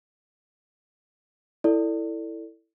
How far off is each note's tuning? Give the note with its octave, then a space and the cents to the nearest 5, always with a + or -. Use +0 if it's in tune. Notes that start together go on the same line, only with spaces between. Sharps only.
E4 +0 A4 +20 D5 +0